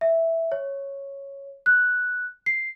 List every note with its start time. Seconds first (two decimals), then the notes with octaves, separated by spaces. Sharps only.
0.01 E5
0.52 C#5
1.66 F#6
2.46 C7